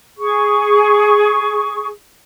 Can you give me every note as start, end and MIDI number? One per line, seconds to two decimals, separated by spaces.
0.18 1.87 68
0.18 1.87 85